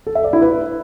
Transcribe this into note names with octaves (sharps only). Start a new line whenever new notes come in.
A4
E5
D5
E4
B4